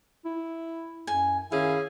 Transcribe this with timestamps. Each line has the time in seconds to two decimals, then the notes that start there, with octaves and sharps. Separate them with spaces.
0.25 E4
1.07 F#2 G#5
1.52 D#3 C#4 E4 G#4 F5